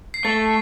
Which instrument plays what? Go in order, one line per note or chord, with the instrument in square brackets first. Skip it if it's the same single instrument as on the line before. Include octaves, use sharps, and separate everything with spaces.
[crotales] C7
[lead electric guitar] A3 [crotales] A6